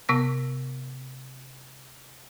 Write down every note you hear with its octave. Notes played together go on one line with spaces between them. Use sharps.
C3 B3 E6 A#6